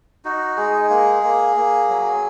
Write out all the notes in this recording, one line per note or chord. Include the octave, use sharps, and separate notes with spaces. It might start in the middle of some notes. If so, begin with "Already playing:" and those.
D#4 F#4
G#3 G#4
A#3
A#3
A#3
F#3